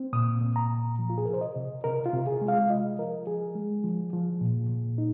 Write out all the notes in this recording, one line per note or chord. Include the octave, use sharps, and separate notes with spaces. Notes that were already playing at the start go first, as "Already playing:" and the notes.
Already playing: C4
A#2 D#6
A#2
A#5
A#2
F3
F4
G#4
C3 A#4
C5
D#5
C3
C3 A#4
F4
C3
G#4
G#3
F5
F4 D#5
F3 A#4
F3 G#4
G#3
F3
F3
A#2
A#2
D#4